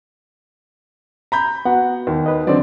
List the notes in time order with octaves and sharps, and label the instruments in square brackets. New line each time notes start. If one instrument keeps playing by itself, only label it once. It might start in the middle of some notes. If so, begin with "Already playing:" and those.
[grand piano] A#5 B5 G6
[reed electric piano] B3 F#4 [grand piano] F#5
[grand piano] D#2
[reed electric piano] B4 D#5
[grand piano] D3 C4 D5 [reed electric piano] F#3